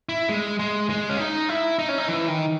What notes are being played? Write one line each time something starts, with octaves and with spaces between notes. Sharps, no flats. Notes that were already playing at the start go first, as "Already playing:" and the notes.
E4
G#3
G#3
G#3
C#4
D#4
E4
D#4
C#4
D#4
E3
D#3